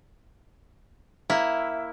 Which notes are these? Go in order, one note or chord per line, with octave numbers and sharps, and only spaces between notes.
A#3 E4